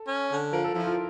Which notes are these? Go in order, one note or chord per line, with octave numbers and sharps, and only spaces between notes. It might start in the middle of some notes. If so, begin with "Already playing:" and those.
Already playing: A4
C#4
D3
F3 A#4
A4
F3 E4
F4